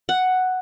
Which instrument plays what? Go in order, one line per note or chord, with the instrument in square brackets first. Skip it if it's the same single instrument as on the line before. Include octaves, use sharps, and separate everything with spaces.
[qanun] F#5